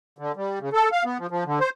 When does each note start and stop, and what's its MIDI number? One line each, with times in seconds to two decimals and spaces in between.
0.18 0.32 50
0.36 0.59 55
0.61 0.69 49
0.73 0.89 69
0.92 1.04 77
1.05 1.18 59
1.19 1.27 53
1.31 1.44 53
1.46 1.59 50
1.60 1.70 72